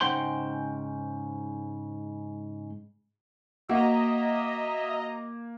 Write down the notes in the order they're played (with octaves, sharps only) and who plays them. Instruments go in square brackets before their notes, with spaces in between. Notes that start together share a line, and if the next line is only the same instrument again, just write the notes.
[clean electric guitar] G#2 C#3 C5 F#5 G5 C6
[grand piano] A#3 [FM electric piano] F#4 [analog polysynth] D#5 A#5 [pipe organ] E5